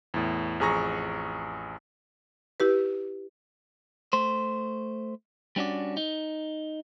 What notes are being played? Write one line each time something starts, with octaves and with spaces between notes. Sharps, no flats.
E2 A2
A1 F2 G#4 A#5 C#6 A#6
E4 G4 B4
A3 C5
G3 C#4 D4 F#4 D5
D#4